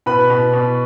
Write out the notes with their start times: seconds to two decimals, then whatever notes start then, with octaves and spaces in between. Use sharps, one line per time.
0.06 B2 B4 B5
0.30 B2
0.53 B2